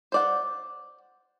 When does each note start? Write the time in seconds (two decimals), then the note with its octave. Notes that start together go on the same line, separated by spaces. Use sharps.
0.12 C5 D5 F#5